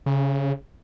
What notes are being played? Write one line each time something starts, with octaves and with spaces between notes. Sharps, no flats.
C#3